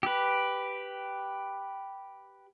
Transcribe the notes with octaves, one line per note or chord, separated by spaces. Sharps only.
G4 B4